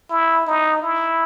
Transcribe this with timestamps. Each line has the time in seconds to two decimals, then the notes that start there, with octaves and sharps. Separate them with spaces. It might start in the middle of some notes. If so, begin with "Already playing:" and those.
0.10 E4
0.47 D#4
0.83 E4